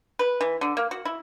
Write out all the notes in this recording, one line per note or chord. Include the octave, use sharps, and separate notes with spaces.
B4
E3
D3
A#3
F#4
E4